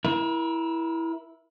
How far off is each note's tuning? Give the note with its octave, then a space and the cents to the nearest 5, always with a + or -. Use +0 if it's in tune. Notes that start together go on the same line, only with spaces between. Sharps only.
E4 +0 A#4 +35